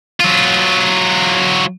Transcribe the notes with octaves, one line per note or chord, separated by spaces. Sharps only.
F#3 F4